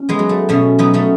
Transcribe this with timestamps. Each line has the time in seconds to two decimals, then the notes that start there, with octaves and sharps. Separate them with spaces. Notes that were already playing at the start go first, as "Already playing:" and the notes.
Already playing: C#4
0.09 G#3 B3
0.19 F#3
0.29 A3
0.49 B2 A3 C#4
0.79 F#3 B3 D#4
0.94 A3 C#4